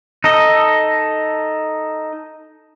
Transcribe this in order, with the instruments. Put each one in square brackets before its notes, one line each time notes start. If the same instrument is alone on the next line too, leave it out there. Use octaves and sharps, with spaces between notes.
[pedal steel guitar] D#4 A4 D#5